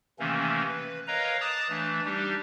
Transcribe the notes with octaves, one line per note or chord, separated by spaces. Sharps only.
C3 D#3 E3 A3 A#3 C#4
B4
A#4 B4 C#5 D#5 F5 A#5
A5 A#5 D6 D#6 F#6 A6
E3 A3 D4
G3 D4 D#4 G4